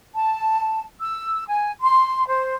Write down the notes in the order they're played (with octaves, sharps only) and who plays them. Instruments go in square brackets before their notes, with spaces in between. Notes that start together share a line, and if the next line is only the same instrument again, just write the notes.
[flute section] A5
E6
G#5
C6
C5